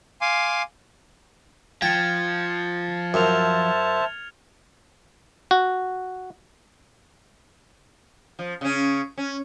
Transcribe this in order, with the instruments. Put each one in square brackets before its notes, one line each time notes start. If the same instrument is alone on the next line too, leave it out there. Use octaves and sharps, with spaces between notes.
[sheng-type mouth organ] F5 G#5 C6 D6
[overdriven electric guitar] F3 [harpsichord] G5 [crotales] G#6 A6 C#7
[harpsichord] F#2 [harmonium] C5 E5 A5 [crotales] F6 F7
[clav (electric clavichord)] F#4
[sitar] F3
C#3 C#4
C#4